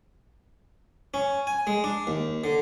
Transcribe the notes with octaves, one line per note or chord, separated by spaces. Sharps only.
C#4
G#5
G#3
D4
D#2
D3